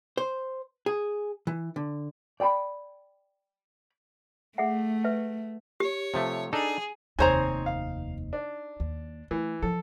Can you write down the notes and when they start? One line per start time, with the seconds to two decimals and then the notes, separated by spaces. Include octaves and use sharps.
0.17 C5
0.86 G#4
1.47 E3
1.76 D3
2.40 D5 G5 A#5 B5
4.58 A3 G#4 E5 F#5
5.04 B4 E5
5.80 G4 C#5
6.14 C3 F3 A3
6.53 D4 D#4 G#4 A4
7.19 F1 D#2 C4 D#4 C5 C#5 G#5 A#5
7.66 F5
8.33 D4
8.80 D#2
9.31 E3 A3
9.62 F3 A4